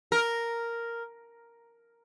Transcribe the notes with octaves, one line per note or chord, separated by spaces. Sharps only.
A#4